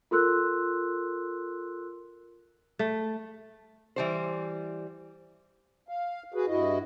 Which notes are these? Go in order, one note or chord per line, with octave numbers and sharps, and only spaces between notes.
F4 A4 A#4 C6 E6 F#6
A3
E3 G3 C5
F5
F#4 G#4 B4
G2 E4 F#4 D#5